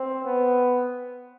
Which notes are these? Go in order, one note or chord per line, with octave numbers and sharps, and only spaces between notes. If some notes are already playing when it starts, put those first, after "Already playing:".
Already playing: C4
B3